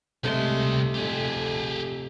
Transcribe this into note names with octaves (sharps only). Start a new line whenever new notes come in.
C2 C3 G#3 A3 C5 C6
F2 G4 G#4